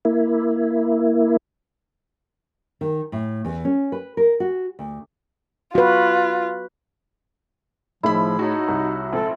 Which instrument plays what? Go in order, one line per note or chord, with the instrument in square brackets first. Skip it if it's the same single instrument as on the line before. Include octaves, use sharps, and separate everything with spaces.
[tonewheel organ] A#3 E4
[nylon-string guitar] D#3
A2
E2
C#4
B4
A#4
F#4
D2
[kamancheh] F4 [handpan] F#4 B4
[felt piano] A2 G#4 B5 [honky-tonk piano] D#3 D#4 [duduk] F3 [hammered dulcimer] E4
[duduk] D#4 [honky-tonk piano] F#4 C#5 A5
[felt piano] C2
[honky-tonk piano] A#1 G#2 C4 [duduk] A4